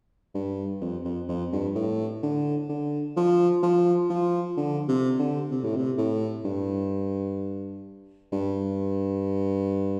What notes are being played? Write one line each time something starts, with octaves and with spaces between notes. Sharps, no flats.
G2
F2
F2
F2
G2
A2
D3
D3
F3
F3
F3
D3
C3
D3
C3
A2
C3
A2
G2
G2